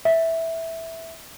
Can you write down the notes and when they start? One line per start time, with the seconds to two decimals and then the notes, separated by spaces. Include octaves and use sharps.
0.05 E5